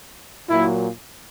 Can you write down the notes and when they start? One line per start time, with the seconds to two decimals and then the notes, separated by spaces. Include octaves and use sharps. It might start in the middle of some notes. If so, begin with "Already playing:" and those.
0.49 A#2 F#3 A#3 E4